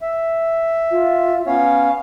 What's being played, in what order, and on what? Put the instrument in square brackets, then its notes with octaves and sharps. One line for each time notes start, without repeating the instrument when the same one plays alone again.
[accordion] E5
[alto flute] F4
[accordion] B3 C#4 C#5 [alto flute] F5